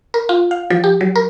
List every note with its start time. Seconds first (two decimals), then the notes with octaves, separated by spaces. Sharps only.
0.14 A#4
0.29 F4
0.51 F5
0.70 F3
0.84 G4
1.01 F#3
1.16 A#4